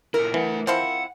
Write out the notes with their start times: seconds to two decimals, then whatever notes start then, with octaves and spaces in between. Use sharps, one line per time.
0.14 A#2 E4 A#4
0.34 E3 A3 F#5
0.67 F3 C4 E4 F#5